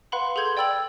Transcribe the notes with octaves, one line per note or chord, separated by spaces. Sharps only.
B4 F5 F#5 B5 C6
G#4 A4 C6 G6 G#6 F#7
D5 G5 B5 E6 A6 F#7